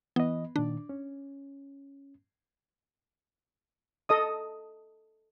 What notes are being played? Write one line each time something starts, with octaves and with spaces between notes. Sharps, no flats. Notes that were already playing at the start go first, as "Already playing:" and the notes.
E3 B3 D#5
A#2 D#3 D4
C#4
A4 D#5 D#6